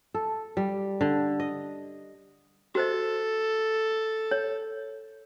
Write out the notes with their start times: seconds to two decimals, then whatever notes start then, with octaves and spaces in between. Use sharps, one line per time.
0.14 A4
0.57 G3
1.01 D3
1.40 D#5
2.75 F#4 A4 C5 D#5
4.31 C#5